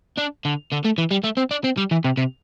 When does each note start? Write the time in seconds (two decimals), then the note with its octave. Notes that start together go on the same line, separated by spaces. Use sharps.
0.18 D4
0.45 D3
0.72 D3
0.85 A3
0.98 E3
1.11 G3
1.24 A3
1.37 C4
1.51 D4
1.64 C4
1.77 G3
1.91 E3
2.04 C3
2.17 C3